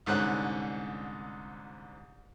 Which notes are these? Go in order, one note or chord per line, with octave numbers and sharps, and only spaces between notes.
C2 G#2 D3 C#4 F#5 F#6